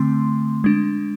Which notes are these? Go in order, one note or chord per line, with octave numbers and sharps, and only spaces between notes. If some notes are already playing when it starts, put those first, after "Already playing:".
Already playing: D3 A3 C4 C6
G#3 D4